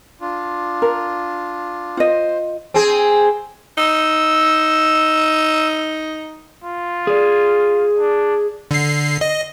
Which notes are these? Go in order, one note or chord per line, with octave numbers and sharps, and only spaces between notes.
D4 F4
A#4
F4 C5 D#5
C4 G#4
D#4 E6
F4
G#4 D5
D4
D3 C7
D#5